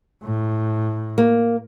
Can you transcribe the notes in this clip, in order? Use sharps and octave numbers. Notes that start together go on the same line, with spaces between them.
A2
A#3